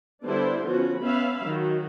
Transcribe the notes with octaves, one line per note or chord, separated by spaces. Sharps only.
D3 G3 B3 D4 E4 C5
F3 B3 C#4 F#4
B3 C#4 E5 F5 B5
D#3 F#3 F#4